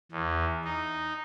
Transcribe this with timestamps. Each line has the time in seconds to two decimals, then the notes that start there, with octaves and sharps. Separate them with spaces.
0.12 E2
0.65 D#4